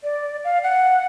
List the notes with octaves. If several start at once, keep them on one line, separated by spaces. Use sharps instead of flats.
D5
F5
F#5